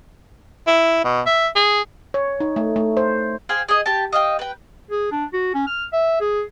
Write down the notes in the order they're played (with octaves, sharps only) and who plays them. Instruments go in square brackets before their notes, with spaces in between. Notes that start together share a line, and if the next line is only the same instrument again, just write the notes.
[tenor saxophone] E4
B2
E5
G#4
[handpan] C#5
D#4
A3
A3
C5
[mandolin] G#4 C5 F5 G5
G#4 D#5
G4 A5
D#5 F5 G5
B4 G5
[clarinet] G#4
D4
F#4
C#4
F6
E5
G#4